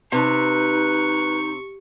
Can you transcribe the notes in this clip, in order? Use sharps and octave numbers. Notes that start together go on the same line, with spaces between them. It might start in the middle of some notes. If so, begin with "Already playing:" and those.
C3 D#4 B4 C#6